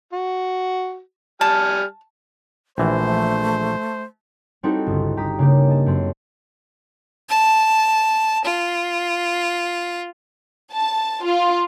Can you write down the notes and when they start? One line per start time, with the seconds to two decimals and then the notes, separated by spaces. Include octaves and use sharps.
0.13 F#4
1.41 G3 G#5 A5 F6
2.78 A#1 E3 A3 C5
4.63 G3 C4 D#4 E4 F#4 A4
4.87 G1 C#2
5.17 G1 G4 A#5 D#6 B6
5.39 C#3 A#3 D4 G4
5.67 D#5 A5
5.86 F#2 C4 A4 C7
7.29 A5
8.44 F4
10.73 A5
11.23 F4